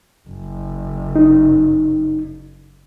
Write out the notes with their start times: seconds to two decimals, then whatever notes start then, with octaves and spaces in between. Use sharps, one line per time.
0.27 F#1
1.16 D#4